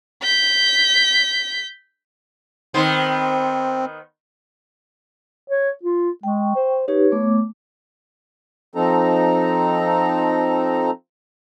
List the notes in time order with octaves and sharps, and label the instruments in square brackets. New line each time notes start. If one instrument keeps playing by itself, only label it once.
[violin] G6 B6
[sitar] D#3 B3 C5 [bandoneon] C4
[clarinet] C#5
F4
[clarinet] G#3 [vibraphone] G5 C#6
[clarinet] C5
[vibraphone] D#4 G4 B4 [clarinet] C#5
[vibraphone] A3 B3 D6
[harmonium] F3 C4 D#4 A4 A#5